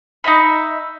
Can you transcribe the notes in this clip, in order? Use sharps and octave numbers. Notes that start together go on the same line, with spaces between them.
D#4 D#5 E5 B5